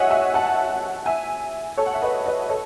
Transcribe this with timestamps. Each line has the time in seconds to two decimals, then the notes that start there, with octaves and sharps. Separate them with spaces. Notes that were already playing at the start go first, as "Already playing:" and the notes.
Already playing: C#5 D#5 E5 F#5 G#5
0.10 E5 G#5
0.34 F#5 A5
1.06 E5 G#5
1.77 A4 C#5
1.86 F#5
1.94 E5
2.02 B4 D#5
2.26 B4 D#5
2.49 A4 C#5